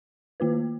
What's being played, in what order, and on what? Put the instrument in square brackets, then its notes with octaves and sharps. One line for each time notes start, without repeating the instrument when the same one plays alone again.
[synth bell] D#3 A#3 F4 B4